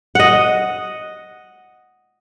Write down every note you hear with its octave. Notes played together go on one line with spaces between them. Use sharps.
D#5 F#5